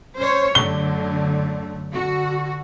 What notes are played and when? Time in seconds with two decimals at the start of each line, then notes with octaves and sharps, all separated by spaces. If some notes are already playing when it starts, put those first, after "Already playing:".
0.17 C#4 C5 C#5
0.55 F#2 D3 A3 G7
1.92 D3 F#4